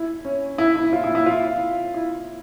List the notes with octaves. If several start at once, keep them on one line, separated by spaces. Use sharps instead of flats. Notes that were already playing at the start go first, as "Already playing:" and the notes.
Already playing: E4
C#4
E4
E4
F4
E4
E4
F4
E4